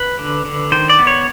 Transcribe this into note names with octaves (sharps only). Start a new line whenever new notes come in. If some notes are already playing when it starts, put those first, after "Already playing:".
Already playing: B4
D3
D3
D#3 C5
D5
B3
C#5